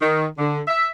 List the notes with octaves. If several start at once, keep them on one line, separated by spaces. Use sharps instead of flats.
D#3
D3
E5